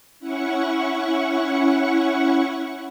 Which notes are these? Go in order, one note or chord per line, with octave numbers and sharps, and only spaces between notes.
C#4 E4 F#5 C#6